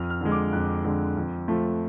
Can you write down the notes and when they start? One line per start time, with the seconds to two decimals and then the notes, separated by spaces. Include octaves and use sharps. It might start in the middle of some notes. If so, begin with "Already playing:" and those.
Already playing: F2 F6
0.10 F6
0.21 D3 G#3
0.32 D6
0.53 F2 F#6
0.84 D3 G#3
1.17 F2
1.48 F3 A3